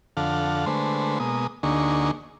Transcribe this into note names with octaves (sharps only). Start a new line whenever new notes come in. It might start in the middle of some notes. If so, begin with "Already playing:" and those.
F2 D3 A4 F5 F#5
D3 G#3 A3 B4 C5
B2 G#3 A#3 D#6
D2 D3 A#3 D#4 G#4 C#6